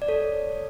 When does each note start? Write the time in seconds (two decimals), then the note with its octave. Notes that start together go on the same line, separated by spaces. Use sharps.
0.02 D5
0.08 A4 C#5